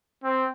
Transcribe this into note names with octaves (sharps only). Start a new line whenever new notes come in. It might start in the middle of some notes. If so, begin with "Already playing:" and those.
C4